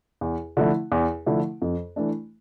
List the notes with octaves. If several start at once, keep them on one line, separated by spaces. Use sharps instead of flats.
E2
D3 F3 A3 E4
E2
D3 F3 A3 E4
F2
E3 A3 D4